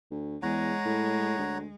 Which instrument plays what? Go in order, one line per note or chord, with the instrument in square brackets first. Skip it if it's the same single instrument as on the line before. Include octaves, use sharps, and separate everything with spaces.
[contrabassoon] D2
[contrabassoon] E2 [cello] G#3 [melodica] C#5 F#5 A#5
[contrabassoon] A2
D2